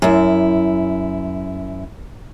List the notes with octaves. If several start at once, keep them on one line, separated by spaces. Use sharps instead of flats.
F#2 E4